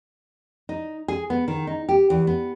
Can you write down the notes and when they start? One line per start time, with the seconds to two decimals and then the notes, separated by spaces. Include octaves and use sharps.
0.69 D#4
1.08 G#4
1.30 B3
1.48 D#3
1.67 D#4
1.89 G4
2.10 E2
2.27 B3